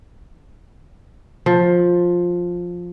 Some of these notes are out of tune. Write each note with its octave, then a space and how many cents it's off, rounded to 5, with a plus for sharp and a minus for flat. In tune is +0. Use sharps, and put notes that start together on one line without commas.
F3 +10